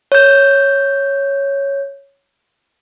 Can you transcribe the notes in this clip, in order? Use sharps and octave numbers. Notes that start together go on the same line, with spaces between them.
C#5 G6